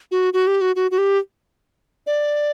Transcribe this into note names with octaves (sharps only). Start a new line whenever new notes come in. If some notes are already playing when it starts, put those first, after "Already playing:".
F#4
F#4
G4
F#4
F#4
F#4
G4
D5